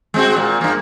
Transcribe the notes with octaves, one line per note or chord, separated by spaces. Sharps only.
G#3 C4 F#4
A#2
G2 A#3